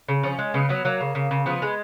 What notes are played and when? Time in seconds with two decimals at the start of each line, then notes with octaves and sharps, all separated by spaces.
0.09 C#3
0.23 F3 C#4
0.39 G#3
0.54 C#3 B3
0.69 F#3 B3
0.85 F#3 A#3
1.01 C#3
1.15 C#3
1.31 C#3
1.46 F3 B3
1.62 G#3